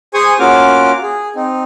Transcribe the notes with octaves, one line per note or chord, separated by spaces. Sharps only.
G#4 C5 G#5 C#6 D#6
A#3 C#4 F4 F#4 D6 F6
G#4
C4 D#4